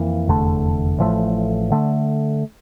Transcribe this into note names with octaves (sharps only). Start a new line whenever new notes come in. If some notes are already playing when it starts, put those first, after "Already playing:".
Already playing: F2 E3 A#3
F1 E2 D3 A3
A1 A2 F3 A3
D3 A3